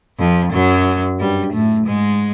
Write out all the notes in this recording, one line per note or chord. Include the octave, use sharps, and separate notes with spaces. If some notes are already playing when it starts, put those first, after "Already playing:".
F2 F3
F#2 F#3
G2 G3
A2 A3
G#2 G#3